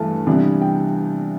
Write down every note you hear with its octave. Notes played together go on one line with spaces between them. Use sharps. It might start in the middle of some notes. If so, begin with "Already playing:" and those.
Already playing: G2 E3 A3 A5
C3 E3 G3 B3 D4
G5